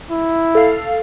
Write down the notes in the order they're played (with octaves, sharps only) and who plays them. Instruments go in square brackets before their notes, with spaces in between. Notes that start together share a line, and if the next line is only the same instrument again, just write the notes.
[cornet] E4
[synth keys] A4 F5